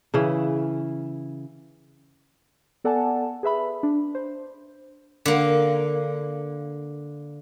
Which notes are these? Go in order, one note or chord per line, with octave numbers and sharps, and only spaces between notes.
C#3 E3
B3 A4 D5 F#5 G#5 A5
G#4 B4 E5 B5
D4
C5
D3 A#3